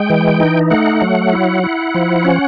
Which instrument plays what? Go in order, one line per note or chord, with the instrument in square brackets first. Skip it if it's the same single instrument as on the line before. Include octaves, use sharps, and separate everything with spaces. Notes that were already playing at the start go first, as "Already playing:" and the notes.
Already playing: [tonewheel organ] G#3 G5
E3
D#4
A3 F#5
F#3
E4
E4
F3
C#4